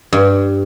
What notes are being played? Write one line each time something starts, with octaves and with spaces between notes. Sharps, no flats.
G2